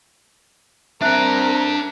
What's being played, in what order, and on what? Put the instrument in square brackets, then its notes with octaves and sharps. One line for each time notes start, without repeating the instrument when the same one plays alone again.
[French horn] C4 [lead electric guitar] D4 G5 [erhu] A#4 [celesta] E5 F#6